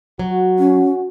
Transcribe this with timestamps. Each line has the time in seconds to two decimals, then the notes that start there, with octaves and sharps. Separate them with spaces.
0.19 F#3 F#4
0.59 C#4